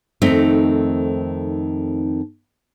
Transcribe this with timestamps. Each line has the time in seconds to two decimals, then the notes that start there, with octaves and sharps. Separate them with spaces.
0.22 F2 D#3 A3 C4 D#4